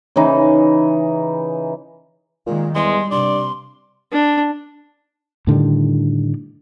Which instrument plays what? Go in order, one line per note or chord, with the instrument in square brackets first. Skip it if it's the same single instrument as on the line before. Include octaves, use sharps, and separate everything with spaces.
[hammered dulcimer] C#3 E3 D#4
[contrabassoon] A#2 [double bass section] D#3 G#3
[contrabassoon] E2 [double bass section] G3 [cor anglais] G#3 [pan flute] C6
[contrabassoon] G2 [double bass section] C3 [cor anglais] D5 [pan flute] C6
[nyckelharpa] D4
[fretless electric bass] A2 D3 D#3 G3